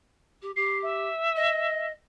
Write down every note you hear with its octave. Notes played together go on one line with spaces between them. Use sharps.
G4
G4 C7
E5
D#5